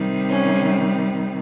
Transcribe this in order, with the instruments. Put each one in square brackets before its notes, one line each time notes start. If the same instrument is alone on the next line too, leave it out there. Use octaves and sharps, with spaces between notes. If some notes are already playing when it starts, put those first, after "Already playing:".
Already playing: [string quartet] C3 D#3 G3
C#4